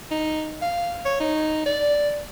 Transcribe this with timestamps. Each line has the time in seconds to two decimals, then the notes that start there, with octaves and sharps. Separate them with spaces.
0.11 D#4
0.62 F5
1.05 C#5
1.20 D#4
1.66 D5